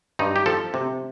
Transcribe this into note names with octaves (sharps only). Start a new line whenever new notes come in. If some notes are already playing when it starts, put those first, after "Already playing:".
G2 D#4
G4
F3 A4
C3